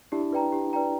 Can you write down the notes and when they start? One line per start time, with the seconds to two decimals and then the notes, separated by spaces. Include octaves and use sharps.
0.12 D4 E4 G4
0.33 B4 D5 G5 A#5
0.52 G4
0.73 B4 D5 G5 A#5